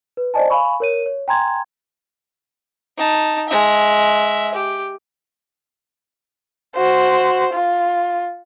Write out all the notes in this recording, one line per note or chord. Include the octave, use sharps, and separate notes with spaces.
B4
C5 D5 D#5 G#5 A5
F5 G#5 B5 C#6
A#4 C#5 D#7
C#5
G5 G#5 A#5 C6 G#6
D#4 A5
G#3 E5
G4
F#4 C5
F4